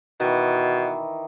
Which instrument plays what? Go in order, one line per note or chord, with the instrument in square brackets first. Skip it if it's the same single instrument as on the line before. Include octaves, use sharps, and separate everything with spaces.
[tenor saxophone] B2 [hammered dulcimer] D#3 E3